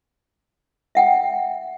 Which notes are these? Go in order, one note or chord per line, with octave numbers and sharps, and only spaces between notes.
E5 F#5 G5